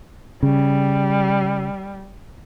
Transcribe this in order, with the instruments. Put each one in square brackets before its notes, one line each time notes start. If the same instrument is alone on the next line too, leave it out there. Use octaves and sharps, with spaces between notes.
[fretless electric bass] C#3 [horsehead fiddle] G3